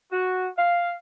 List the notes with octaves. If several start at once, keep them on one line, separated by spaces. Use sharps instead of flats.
F#4
F5